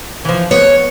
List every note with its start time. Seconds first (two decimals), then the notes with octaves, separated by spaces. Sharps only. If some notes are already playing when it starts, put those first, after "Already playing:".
0.25 E3 F3
0.51 B3 C#5